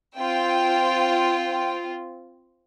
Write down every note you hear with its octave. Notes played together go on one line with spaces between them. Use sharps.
C4 F4 G5